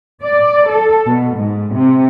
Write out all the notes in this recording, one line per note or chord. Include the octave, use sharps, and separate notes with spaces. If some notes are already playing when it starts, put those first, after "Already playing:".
D5
A4
B2
G#2
C3